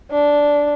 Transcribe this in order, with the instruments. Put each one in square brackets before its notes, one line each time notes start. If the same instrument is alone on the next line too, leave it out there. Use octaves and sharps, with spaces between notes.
[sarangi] D4